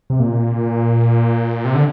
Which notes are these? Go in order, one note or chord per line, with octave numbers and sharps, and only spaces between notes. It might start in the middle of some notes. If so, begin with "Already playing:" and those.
C3
A#2
C3
D3